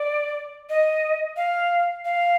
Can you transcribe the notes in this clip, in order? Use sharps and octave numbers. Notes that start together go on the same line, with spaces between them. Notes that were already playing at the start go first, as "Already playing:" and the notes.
Already playing: D5
D#5
F5
F5